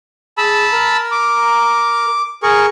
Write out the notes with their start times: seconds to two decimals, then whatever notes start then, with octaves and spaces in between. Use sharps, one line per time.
0.38 G#4 A5 B5 E6
0.72 A#4 A#5
1.12 D6
2.43 G#4 A#4 C#6